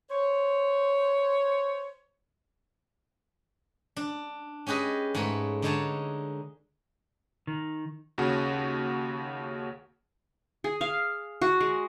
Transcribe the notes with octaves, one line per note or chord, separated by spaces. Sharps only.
C5 C#5
D4
C#4 G4 G#4 B4 D#5
G#2 A3 G#4 B4 C#5
D3 G#3 D#4 C#5 G#5 A5
D#3
D#2 C#3 F#4
G#4
F5
F#4
G#3